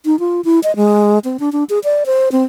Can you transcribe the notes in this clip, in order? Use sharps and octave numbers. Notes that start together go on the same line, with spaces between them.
D#4
F4
E4
D#5
G#3
C4
D4
D4
G#4
D5
C5
C4